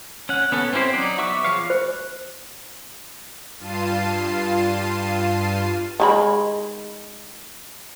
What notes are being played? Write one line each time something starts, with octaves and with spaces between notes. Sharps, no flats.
C#4 F#5
B3 C#4 A4
C4 C#4 E4 G4 C5
F#3 D#4 F#4 D5
B3 E5 C#6 D6 E6
F3 G#4 C#5 F5
C5
G2 F4 A5 C7 D#7
D#3 G#3 B5